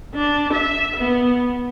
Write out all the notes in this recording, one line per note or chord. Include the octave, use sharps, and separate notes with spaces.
D4
E5
B3